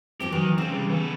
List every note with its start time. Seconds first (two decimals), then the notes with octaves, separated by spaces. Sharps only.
0.20 G2 F3 C4 G4
0.32 D#3 E3 F#3
0.46 E3
0.58 C#3 G#3 C4 C#4
0.71 C3 G3
0.90 E3 B3 A4